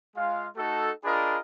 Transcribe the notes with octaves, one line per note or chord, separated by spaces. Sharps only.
G#3 F4 F5
A3 D#4 F#4 A4
D4 F4 G#4 A#4 D#5 B5